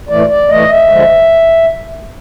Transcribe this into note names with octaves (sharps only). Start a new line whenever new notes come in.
A2 E3 A3 D5
D5
A2 E3 A3 D#5
E5
F#2 D3 F3 G#3